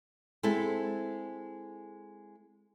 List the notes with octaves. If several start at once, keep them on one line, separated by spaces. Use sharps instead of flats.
G#3 C4 E4 A4